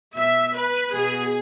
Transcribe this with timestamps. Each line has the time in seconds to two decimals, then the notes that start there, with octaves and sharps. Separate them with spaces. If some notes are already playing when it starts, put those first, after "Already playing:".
0.15 B2 E5
0.53 B4
0.92 B2 G#4